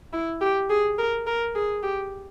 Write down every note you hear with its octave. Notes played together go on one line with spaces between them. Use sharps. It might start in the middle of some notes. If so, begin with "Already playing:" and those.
E4
G4
G#4
A#4
A#4
G#4
G4